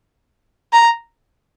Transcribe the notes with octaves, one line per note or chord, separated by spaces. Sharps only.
A#5